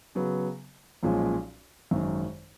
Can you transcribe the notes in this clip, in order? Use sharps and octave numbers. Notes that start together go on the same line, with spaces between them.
C#3 F#3 B3
B1 A#2 F3 G#3 C#4
G#1 F#2 D#3